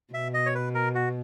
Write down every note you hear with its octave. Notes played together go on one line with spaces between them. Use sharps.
B2 E5
D#5
C#5
B4
A#4
F#4